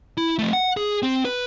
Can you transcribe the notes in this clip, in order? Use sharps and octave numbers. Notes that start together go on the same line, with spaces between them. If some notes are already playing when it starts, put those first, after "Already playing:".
E4
F3 A3
F#5
G#4
C4
B4